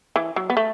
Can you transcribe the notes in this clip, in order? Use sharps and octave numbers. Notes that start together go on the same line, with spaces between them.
E3
F#3
B3
A3